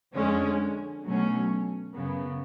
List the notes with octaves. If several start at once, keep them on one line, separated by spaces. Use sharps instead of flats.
F2 D3 G#3 C#4
B2 F#3 A3 C#4
F#2 C#3 F#3 B3